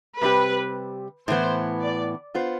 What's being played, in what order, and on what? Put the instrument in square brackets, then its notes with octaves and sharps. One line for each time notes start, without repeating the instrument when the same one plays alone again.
[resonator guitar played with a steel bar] C3 G3 C4 G4 [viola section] B4
[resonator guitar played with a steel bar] A2 E3 B3 [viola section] C5
[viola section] D5
[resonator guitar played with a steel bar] B3 F4 C5